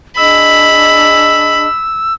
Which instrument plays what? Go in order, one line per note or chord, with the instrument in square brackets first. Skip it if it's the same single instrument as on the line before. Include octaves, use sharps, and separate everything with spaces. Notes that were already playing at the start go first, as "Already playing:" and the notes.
[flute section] D4 G#4 D#5 [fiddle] B5 [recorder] E6